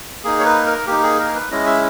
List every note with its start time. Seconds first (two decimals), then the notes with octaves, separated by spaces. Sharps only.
0.24 A#3 D#4 G#4
0.39 C#5
0.45 B4
0.67 A#4
0.87 A#3 D#4 G4
1.03 G#4
1.20 A#4
1.35 B4
1.51 G#3 C#4 E4 D#5
1.66 E5